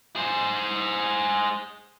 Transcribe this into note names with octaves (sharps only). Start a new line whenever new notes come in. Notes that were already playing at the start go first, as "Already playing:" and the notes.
G#4 C5